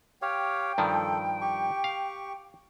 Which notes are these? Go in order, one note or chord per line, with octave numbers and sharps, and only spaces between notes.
G4 C#5 F5 G5
G2 D#3 F3 A4
G4 C#6
F5